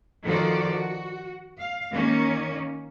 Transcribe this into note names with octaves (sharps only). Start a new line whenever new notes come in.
D#3 F3 F#4 A4 C5 D5
F#4
F5
D#3 A#3 C#4